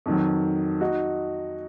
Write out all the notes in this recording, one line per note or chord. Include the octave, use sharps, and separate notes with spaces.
F2 D#3 F#3
D#4 F#4